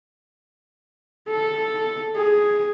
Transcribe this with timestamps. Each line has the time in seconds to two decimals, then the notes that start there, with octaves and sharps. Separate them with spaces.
1.30 A4
2.16 G#4